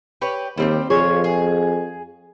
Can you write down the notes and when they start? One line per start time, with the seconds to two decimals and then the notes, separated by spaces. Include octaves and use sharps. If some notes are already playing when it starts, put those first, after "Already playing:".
0.22 G4 B4 C#5
0.58 D#2 G3 C4 G4
0.90 F2 F4 G#4 C#5
1.24 G#4